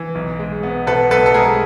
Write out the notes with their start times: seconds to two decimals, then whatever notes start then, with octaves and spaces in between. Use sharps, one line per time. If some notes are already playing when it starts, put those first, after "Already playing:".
Already playing: E3
0.15 B1
0.39 G#3
0.63 B3
0.87 B2 A4 B4
1.11 B1 A4 B4
1.26 A4
1.34 G#3 G#4 A#4